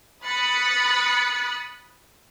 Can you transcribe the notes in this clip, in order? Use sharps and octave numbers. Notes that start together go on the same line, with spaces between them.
B5 D#6 F#6 A6 B6 C#7